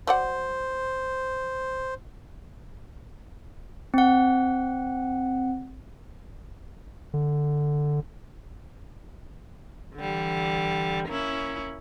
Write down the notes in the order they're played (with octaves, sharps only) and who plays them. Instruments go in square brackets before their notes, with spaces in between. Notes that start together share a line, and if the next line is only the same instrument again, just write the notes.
[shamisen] F#3 D5 F#5 [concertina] C5
[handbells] C4 F#5
[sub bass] D3
[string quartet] D3 E3 G3
A#3 C#4 E4